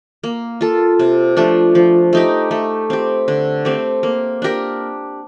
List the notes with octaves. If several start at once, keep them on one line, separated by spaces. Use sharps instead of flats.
A#3
F4 A4
C3
F3 A3 D4
F3
A3 D#4 G4
A3
C4 G4
D3
A3 C4 G4
A#3
D4 G4 A#4